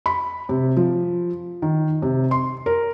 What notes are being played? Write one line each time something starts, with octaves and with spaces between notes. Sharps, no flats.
B5
C3
F3
D#3
C3
C6
A#4